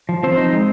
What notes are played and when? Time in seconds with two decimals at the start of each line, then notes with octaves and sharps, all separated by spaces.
0.09 F3
0.23 F3 C4 C5
0.37 D#4
0.53 G#3